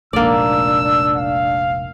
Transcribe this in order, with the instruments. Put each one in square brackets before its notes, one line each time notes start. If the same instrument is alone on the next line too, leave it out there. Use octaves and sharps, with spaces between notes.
[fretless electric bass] F1 A#1 G#2 [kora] A#3 D5 [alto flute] D4 [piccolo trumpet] E6
[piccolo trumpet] F5